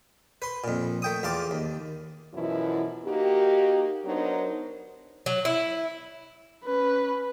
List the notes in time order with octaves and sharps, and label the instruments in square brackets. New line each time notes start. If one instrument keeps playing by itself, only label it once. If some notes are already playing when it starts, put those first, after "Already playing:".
[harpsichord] B4 C6
F2 A#2
A3 G5 D#6
E2 F4 A5 D6
D#2
[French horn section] F#2 B2 E3 F3 E4
A#3 D#4 F#4 G4
F#3 B3 D4 D#4 A#4 C5
[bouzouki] F#3
E4
[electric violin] C#4 B4